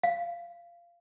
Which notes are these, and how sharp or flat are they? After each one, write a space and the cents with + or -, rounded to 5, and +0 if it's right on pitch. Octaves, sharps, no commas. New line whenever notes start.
F5 -20